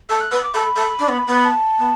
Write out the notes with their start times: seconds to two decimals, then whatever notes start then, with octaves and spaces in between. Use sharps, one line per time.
0.09 A4 E6
0.21 F#6
0.31 B4 E6
0.43 D6
0.54 A4 B5
0.76 A4
0.99 D4
1.08 B3
1.27 B3
1.34 B5
1.45 A5
1.79 B3